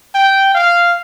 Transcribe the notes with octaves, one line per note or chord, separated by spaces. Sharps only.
G5
F5